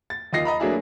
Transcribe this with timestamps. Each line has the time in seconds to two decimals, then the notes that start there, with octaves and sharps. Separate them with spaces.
0.10 A6
0.33 D#2 F4 D#5 A#6 C7
0.45 D#5 A#5 B5
0.60 F#3 A3 A#3 D4 E4 G#4